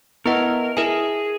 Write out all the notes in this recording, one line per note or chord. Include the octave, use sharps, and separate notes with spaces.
B3 E4 A#4 B4 D#5 F#5
E4 G#4 A#4 E5 G#5